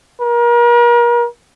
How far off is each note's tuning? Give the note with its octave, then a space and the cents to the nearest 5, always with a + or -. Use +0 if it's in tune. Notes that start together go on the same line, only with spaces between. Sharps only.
A#4 +35